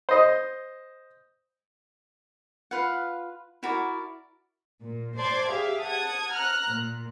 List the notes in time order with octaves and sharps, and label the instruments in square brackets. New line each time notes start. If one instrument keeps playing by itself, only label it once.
[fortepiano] C5 D#5
[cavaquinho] F4 B4 F5 F#5
E4 F#4 A#4 D5
[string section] A#2
C5 D5 A5 C6 D6 G#6
G4 G#4 E5 F5
F#5 A5 D#6 G#6
A#5 F6 F#6
A#2